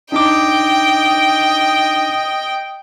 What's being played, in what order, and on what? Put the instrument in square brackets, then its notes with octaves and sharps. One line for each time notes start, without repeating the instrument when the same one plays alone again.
[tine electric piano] D4 D#4 D6 [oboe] D#5 [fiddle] G5